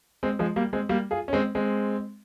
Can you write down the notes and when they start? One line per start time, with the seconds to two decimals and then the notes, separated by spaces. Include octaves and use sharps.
0.23 G#3 C4
0.39 F3 G#3
0.56 G3 A#3
0.73 G#3 C4
0.89 G3 A#3
1.11 F4 G#4
1.28 C#4
1.33 G#3 C4
1.55 G#3 C4